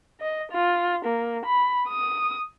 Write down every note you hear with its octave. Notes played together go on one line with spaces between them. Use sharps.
D#5
F4
A#3
B5
D#6